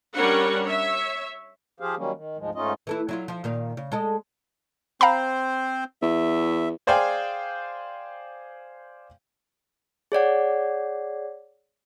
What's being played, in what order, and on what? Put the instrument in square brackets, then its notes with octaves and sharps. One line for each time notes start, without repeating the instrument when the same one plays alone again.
[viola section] G3 C#4 D4 A#4 C#5 F#5
C#5 E5
[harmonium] F3 G4 G#4 C5 F5
D#3 F#3 G3 A#3 C#4
D#3
D2 G#2 F3 G#3
G#2 A3 C#4 D#4 F4 D#5
[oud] E3 A3 E4
F#3 E4 F4
F3 F4
A#2 D#3 F5
C#3
G#3 A4 D#5
[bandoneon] C4 C5 [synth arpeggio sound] F5 A#5 B5
[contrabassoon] E2 [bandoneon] E5
[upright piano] G#4 C5 D5 F5 G5 G#5
[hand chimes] G#4 C#5 D5 F#5